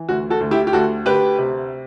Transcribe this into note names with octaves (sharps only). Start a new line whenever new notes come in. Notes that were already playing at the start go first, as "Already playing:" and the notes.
Already playing: E3
D2 F#4
F#4 A4
D2
E4 G4
G4
D2 F#4 A4
D2 G4 B4
C3